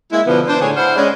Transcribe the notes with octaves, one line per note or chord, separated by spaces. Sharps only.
G#3 A#3 E4
B2 D3 F3 B3
D4 C5
A2 D3 G#4 C#5
E4 C5 F5 F#5
G#3 C#4 D4 G#4 D#5